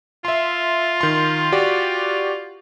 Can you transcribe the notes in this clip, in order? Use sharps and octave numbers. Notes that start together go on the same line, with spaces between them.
F4 E5 C6
D#3 C6
F#4 G4 D5